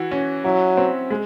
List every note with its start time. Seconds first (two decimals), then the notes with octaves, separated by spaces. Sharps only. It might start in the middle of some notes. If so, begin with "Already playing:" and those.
Already playing: E3 F#4
0.11 C#4
0.45 F#3 E4
0.77 C4
1.11 G#3